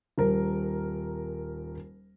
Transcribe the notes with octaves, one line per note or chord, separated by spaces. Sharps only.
D#1 A#4